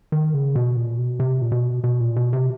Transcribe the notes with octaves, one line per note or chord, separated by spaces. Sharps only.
D#3
C#3
B2
A#2
B2
C3
A#2
B2
B2
A#2
B2
C3